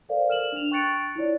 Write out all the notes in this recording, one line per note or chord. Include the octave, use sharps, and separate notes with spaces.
A4 A#4 C5 D5 F5
F6 E7 F#7
D4 F7
G5 C#6 F#6 A6 C#7 D7
E4 F4 C#5 D5